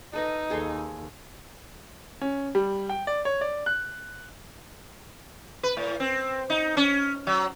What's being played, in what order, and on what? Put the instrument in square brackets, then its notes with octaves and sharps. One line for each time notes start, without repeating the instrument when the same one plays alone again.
[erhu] D#4 [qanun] A4 B4 D#5
[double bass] D#2 [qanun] G#4 A4 C6
[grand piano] C#4
G3
G5
D5
C#5
D5
F#6
[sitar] B4
A2
C4
D#4
C#4
F#3